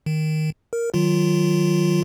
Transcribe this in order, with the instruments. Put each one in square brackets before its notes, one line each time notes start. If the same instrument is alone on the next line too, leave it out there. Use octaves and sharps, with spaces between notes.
[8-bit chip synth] D#3
A#4
D#3 F#3 F4